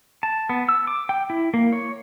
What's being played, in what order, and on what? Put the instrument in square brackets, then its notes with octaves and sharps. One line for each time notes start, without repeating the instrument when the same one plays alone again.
[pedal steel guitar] A5
B3
E6
D6
G5
E4
A#3
C#5